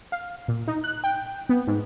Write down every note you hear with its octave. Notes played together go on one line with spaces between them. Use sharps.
F5
A#2
D#4
F#6
G5
B3
G#2